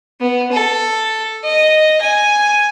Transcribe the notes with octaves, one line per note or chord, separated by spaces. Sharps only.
B3
A4
D#5
G#5